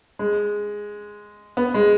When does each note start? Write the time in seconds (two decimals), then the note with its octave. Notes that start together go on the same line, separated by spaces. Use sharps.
0.19 G#3
1.57 B3
1.74 G#3